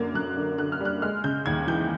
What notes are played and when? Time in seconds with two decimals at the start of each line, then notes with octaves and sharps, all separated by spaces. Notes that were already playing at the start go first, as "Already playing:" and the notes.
Already playing: F#2 D3 A#3
0.14 F#2 F#6
0.37 D3
0.58 D3 F#6
0.72 F6
0.81 G3 F#6
1.02 G#3 F6
1.24 C#3 G6
1.46 D#2 G#6
1.67 E3 G6